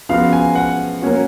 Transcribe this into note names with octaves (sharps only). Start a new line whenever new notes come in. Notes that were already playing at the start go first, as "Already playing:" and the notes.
C#3 F3 B3 F#4 F5
G#5
F#5
F#3 A#3 C#4 F#4